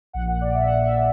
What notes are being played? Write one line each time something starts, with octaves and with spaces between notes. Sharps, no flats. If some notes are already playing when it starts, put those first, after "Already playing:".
A#1 A#2 F#5
F#5
D5
E5
F#5
E5